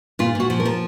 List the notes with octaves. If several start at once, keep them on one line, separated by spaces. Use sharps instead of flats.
A#2 F4
A#2 F#4
F3
A#4
F3